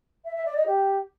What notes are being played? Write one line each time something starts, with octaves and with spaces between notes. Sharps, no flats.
E5
E5
D5
D#5
G4